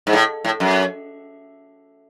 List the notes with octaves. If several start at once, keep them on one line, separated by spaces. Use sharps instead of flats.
G#2
A2
A2
F#2